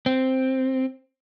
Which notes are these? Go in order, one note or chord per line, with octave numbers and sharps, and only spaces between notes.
C4